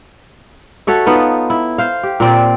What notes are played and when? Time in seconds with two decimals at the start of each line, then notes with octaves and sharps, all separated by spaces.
0.87 F#4 A4 C#5 E5
1.06 B3 D#4 F4
1.50 E4
1.78 C5 F5
2.03 G4
2.20 A#2 C4 D5